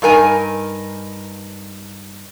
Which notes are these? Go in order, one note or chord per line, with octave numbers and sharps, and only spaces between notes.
G2 D#4 A#4 G#5